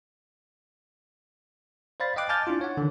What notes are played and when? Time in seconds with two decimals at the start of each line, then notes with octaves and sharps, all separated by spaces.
2.00 C5 D5 F5 B5 A6
2.16 D#5 F5 G5 D6 F#6
2.29 G#5 A5 D6 F6 G6 A6
2.47 D4 E4 F4
2.61 C#5 F#5
2.77 D3 D#3